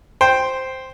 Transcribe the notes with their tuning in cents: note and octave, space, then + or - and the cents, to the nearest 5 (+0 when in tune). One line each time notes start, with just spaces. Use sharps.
C5 +0 G5 +0